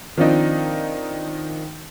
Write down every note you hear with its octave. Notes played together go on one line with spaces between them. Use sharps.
D#3 F3 C4 D4 D#4 F4